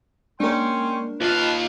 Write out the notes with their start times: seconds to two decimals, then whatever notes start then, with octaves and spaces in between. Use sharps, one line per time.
0.40 G#3 A#3 C#4 D4 A#4 G5 C6
1.21 D#2 F4 B4 F5 A5